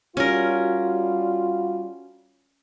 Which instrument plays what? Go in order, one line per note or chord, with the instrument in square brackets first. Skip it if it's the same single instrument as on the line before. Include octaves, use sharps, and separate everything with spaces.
[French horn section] G3 F4 F#4 [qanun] C#4 A#4